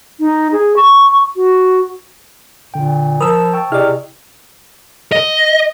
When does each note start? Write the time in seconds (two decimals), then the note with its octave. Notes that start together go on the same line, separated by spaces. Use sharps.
0.20 D#4
0.52 G#4
0.76 C#6
1.36 F#4
2.74 A#2 D3 G5
3.20 F3 A#4 B5 D#6 E6
3.54 G5 A5 C#6 E6
3.72 C3 E4 G#4 D5 D#5 F6
5.12 D#5